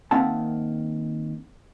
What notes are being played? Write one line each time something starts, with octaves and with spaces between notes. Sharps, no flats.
D#3 A#3 C4 E5 F#5 A5